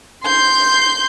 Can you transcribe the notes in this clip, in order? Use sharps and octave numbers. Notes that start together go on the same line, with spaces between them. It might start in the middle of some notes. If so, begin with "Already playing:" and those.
C6 G6